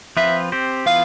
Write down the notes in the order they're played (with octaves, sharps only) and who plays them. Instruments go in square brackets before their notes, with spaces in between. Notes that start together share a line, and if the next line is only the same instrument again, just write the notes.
[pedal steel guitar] F3 C4 F4 B4 [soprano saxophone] E5
[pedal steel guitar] C4 G4 C5
[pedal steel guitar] E3 B3 F4 B4 [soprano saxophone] F5